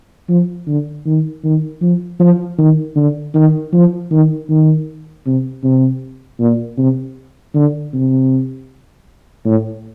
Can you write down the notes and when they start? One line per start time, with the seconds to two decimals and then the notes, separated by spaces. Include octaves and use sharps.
0.29 F3
0.67 D3
1.06 D#3
1.44 D#3
1.82 F3
2.20 F3
2.58 D#3
2.96 D3
3.35 D#3
3.73 F3
4.11 D#3
4.49 D#3
5.26 C3
5.64 C3
6.40 A#2
6.78 C3
7.54 D3
7.93 C3
9.45 A2